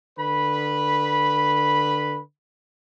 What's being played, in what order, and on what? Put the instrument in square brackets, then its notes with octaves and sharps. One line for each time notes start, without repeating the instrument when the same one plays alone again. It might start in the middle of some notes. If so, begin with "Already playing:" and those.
[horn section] D3 B4 B5